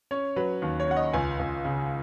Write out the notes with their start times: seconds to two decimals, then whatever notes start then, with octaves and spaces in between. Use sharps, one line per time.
0.11 C#4 C#5
0.36 F#3 B4
0.62 D#2
0.80 C#5
0.88 C#4 F#5
0.96 D#5
1.13 C#2 G#5
1.39 C#2
1.65 C#3